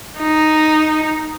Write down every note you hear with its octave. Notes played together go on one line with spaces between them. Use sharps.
D#4